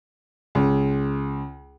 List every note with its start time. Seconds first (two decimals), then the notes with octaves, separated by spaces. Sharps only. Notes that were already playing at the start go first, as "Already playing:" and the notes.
0.55 C#2